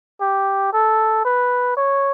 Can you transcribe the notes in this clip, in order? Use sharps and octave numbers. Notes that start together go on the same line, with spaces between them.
G4
A4
B4
C#5